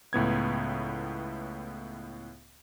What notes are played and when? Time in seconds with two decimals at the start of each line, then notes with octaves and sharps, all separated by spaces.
0.13 C#2 A2 B3 G#6